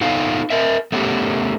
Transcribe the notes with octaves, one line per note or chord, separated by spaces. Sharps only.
B3 D#4 F4 A4 F5
A#4 D#5 E5
A3 B3 C#4 G4